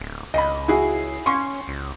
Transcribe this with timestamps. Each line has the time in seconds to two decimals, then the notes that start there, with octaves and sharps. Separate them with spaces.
0.01 D1
0.34 C#2 D#5 B5
0.68 E4 F#4 G#4
1.26 C#4 C6 C#6
1.68 C#2